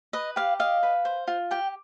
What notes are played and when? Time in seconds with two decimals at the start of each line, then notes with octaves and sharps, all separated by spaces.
0.13 B4 D#5
0.36 G4 F5
0.59 D#5 F5
0.83 B4
1.05 C5
1.28 F4
1.51 G4 G5